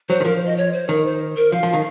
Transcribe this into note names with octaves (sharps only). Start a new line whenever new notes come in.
F#3 C5
D#3
F3 A#4
C5
D#5
C#5
C5
D#3 A#4
C5
A#4
F3 F5
F3
D#3